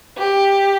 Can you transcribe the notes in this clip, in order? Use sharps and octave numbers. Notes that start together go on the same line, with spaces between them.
G4